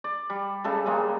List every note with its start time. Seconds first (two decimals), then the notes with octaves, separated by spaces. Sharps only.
0.04 D5
0.30 G3
0.64 C#3 G3 G#3 A4
0.86 C#3 G3 G#3 A#3